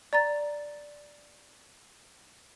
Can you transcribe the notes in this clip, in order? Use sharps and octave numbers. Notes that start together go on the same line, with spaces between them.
D5 A#5 A6